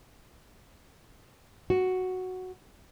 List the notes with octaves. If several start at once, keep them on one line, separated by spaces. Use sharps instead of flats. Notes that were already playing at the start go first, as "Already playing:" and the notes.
F#4